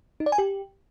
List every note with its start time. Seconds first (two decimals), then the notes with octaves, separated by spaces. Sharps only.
0.20 D#4
0.26 D5
0.32 G#5
0.38 G4